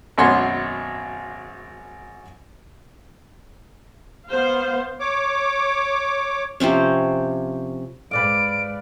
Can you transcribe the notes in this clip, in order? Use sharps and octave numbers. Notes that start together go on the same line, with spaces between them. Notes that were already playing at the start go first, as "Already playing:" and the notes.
G#1 F#2 B2 C#4 C#5 C6
B3 C5 F5
C#5 D6
C3 F3 C4 C#4
G#2 B4 D5 F5 D7